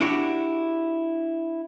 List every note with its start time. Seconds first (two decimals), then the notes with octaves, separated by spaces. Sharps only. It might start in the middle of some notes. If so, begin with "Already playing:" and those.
0.01 D4 E4 F#4 G4